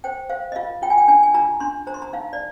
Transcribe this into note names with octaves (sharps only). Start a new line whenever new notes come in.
C5 G5
C5 F5
D#5
F4 F5
F4 G5
G#5
G5
D4 G#5
G#5
F4 A#5
D4 C6
C5 A#5
C6
A#5
D#4 F5
D5